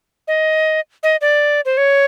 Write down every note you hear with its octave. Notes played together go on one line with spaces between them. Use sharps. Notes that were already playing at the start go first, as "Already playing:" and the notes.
D#5
D#5
D5
C5
C#5